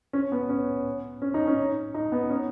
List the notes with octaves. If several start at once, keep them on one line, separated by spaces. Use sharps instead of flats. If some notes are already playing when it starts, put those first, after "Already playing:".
C#4
B3
C#4
C#4
D#4
C#4
D#4
B3
C#4